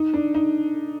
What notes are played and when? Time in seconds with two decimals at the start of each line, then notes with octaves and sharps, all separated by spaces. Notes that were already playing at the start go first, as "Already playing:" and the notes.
Already playing: D#4
0.14 D4
0.34 D#4